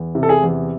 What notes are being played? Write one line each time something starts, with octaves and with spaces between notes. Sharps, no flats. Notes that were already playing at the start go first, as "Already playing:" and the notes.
Already playing: E2
C3
A4
G#4
E2